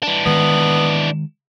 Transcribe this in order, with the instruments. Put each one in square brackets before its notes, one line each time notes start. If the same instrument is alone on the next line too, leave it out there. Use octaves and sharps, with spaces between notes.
[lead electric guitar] E3 D4
[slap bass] D#3 G#3 [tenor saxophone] B3